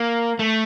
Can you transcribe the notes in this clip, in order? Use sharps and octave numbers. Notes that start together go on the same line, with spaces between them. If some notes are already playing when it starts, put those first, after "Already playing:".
Already playing: A#3
A3